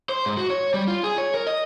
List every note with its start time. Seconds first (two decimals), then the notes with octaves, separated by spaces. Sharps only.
0.09 C5
0.26 G#2
0.37 F#4
0.50 C#5
0.74 G3
0.88 F4
1.03 G#4
1.18 C#5
1.34 A#4
1.47 D#5